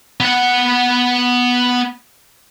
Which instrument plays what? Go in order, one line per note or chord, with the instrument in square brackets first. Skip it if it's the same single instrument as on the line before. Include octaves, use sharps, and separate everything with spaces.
[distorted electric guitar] B3 F#5